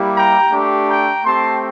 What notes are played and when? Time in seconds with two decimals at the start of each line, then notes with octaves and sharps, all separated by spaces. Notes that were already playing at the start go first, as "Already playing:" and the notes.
Already playing: G3 A#3 E4 G4
0.16 G5 A#5
0.52 A3 D4 G4
0.89 G5 A#5
1.25 A3 C4 G4 A5 C6